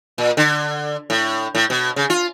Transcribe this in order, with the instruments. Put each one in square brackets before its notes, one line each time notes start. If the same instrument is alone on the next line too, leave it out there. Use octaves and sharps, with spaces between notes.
[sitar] A#2
D3
A2
A2
B2
C#3
F4